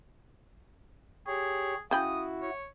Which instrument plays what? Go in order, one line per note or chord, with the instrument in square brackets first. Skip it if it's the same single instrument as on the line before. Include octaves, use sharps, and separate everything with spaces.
[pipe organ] G4 C#5 [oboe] G#4
[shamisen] C#3 G5 B5 [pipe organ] E4 F#4 [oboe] D#6
[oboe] C#5